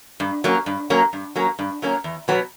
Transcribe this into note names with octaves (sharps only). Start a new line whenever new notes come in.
G2
F#3 A#3 C#4
G2
F#3 A#3 C#4
G2
F#3 A#3 C#4
G2
F#3 A#3 C#4
E2
B2 F#3 B3